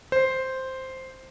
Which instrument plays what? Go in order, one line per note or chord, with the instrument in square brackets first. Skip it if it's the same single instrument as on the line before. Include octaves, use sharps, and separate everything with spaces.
[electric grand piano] C5